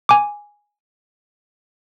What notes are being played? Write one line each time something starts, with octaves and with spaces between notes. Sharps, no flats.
G#5 D6